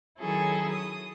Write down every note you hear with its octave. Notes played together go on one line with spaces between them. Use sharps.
D#3 F#3 C#4 E4 G#4 A4
D#6